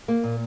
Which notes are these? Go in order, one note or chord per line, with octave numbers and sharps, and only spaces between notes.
A#3
A#2